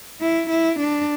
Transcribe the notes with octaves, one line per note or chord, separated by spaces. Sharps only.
E4
E4
D4